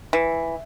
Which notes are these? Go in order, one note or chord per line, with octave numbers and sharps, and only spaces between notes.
E3